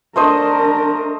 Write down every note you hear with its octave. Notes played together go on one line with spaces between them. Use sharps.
A3 D4 A#4 C5 D#5